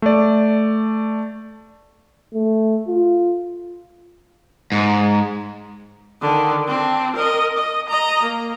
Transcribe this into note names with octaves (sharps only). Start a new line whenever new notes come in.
A3 D5
A3
F4
G#2
D3 D#3
C4 D4
A#4 D#5
D#5
D#5 A#5
A#3